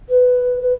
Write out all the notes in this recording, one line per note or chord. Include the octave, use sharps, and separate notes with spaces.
B4
B4